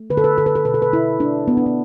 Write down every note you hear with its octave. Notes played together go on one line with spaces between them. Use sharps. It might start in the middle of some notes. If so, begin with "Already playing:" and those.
Already playing: A3
D3 B4
A4
B4
D3 A4
B4
A4
B2 B4
A4
B4
B2 E4
A3 D4
A3 B3
D4
B3